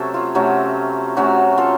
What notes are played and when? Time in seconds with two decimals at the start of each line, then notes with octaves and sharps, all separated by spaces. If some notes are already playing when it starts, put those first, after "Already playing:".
Already playing: C3 F#3 A3 C#4 A4
0.14 F4
0.35 C3 F#3 A3 C#4
1.16 C3 F#3 A3 C#4 F#4
1.58 F4 A4